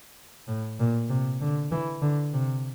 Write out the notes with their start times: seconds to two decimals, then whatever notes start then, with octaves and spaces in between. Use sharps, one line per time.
0.48 A2
0.79 A#2
1.09 C3
1.41 D3
1.71 E3
2.02 D3
2.33 C3